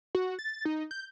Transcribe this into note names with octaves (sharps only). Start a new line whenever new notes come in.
F#4
A6
D#4
G6